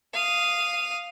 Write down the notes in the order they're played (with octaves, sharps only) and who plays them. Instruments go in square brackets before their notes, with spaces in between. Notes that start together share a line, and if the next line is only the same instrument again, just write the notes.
[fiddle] F5 D#6